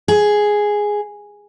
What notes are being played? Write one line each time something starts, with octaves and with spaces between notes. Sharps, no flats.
G#4